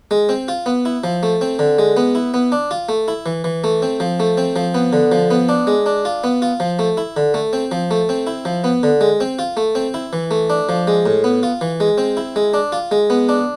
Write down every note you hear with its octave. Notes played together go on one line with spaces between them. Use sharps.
G#3
C4
F4
B3
E4
F3
A3
C4
D3
G#3
B3
E4
B3
D4
F4
A3
E4
E3
E3
A3
C4
F3
A3
C4
F3
B3
D3
F3
B3
D4
G#3
D4
F4
B3
F4
F3
A3
E4
D3
A3
C4
F3
A3
C4
E4
F3
B3
D3
G#3
C4
F4
A3
C4
E4
E3
A3
D4
F3
G#3
A2
B3
F4
E3
G#3
C4
E4
G#3
D4
F4
G#3
B3
D4